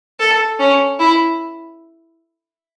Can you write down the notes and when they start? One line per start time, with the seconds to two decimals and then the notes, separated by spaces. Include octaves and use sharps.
0.20 A4
0.59 C#4
0.99 E4